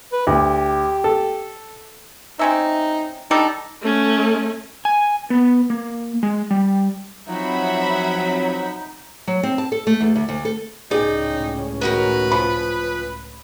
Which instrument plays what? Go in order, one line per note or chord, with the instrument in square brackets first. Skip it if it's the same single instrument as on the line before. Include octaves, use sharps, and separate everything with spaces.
[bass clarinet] B4
[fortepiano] D2 [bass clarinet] G4
[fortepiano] A4
[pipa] C4 C#4 E5 [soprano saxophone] D#4
[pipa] G3 D4 A4 [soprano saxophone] D#4
[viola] A3 C#4
[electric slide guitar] G#5
B3
A#3
G#3
G3
[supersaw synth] F3 C4 [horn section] F#3 [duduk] D#4 [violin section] E5 F#5 B5
[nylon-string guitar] F#3
C4
A5
A4
A3
E2
D2
D2
A4
[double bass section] C#2 A2 C#4 [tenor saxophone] D#4 [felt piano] G#4 [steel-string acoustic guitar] D5 G5
[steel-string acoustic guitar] D#3 F#4 A#4 [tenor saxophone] B4
[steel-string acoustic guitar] F3 [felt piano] B5